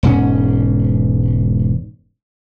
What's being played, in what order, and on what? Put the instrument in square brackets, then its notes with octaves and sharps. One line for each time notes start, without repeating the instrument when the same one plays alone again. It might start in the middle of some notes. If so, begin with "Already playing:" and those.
[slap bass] E1 G#2 C#4